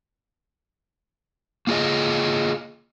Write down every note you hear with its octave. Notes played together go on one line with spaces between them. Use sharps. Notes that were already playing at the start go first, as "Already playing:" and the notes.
A#3 F4 G#4 D#5